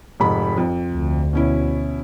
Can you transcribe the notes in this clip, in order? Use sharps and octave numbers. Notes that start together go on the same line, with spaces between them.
F1 G#2 B5
F2
D2
B2 C#4 E4